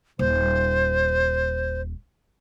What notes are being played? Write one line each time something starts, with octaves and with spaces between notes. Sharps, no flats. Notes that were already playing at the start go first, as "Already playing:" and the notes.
D#1 C5